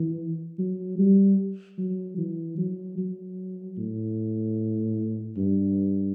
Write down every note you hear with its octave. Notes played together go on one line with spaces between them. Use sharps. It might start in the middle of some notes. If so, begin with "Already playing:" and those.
Already playing: E3
F#3
G3
F#3
E3
F#3
F#3
A2
G2